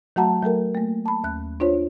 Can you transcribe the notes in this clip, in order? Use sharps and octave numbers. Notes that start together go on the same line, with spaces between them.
F#3 A3 F#4 F#5 A5 A#5
F#3 A3 A4 A#4
A3 A#3
A5 B5
D#2 F#6
D4 F4 C5 C#5